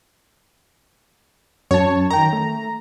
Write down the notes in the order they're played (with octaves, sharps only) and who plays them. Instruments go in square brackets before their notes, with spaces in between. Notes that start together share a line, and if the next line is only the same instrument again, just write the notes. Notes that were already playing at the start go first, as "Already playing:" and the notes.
[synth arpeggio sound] F#2 A5 [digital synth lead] C#5
[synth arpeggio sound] D#3 G5 [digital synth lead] A#5
[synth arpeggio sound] A3